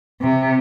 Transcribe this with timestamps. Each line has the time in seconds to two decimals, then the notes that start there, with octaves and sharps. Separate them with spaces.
0.21 C3